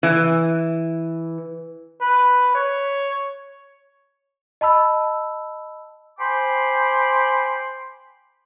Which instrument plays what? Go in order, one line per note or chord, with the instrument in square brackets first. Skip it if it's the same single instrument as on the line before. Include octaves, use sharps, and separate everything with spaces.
[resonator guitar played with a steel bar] E3
[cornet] B4
C#5
[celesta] D#5 A5 B5 E6
[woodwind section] C5 G5 G#5 B5 C6 D6